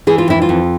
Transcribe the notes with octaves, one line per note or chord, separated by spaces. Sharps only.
E3 G#4
F4
F2 E4
F4
F2